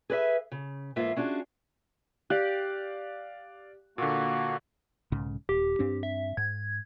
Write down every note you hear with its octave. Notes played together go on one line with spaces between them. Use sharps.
G#4 B4 D5 E5
C#3
E2 G#2 A#3 F4 E5
C#4 D4 F4 F#4 G#4
G4 D5 F5 F#6
A#2 D3 A#3 F#4
B1 G#2 C#3
D#1 G4
G2 C4 D4
E5
G#2 G#6